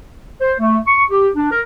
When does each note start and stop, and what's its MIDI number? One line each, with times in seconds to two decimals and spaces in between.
0.41 0.53 72
0.59 0.77 57
0.87 1.04 85
1.10 1.28 67
1.36 1.47 62
1.51 1.61 70